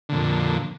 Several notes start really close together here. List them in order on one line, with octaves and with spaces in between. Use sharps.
D3 A#2 F2